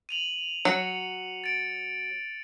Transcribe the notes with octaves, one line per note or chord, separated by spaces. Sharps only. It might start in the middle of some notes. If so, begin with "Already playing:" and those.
D#7 F7 F#7
F#3 C#7
A6 D7